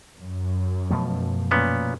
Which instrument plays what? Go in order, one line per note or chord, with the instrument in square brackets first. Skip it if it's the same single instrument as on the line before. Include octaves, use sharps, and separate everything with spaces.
[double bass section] F#2
[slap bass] B2 F3 A3
[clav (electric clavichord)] A#2 B3 C#4